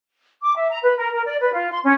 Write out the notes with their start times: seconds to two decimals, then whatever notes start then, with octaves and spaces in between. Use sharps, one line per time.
0.42 D6
0.56 E5
0.70 A#5
0.83 B4
0.97 A#4
1.14 A#4
1.26 D5
1.40 B4
1.53 F4
1.71 C6
1.83 C#4